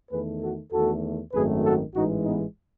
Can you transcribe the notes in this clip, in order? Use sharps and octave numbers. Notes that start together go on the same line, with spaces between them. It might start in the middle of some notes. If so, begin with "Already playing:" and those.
E2 D#3 A3 G#4 B4
F#4 A4
E2 D#3 A3 F#4 A4
G#1 F#2 D#3 A3 G#4 B4
F#4 A4
A1 G#2 E3 G#3 D#4 F#4
B3 D#4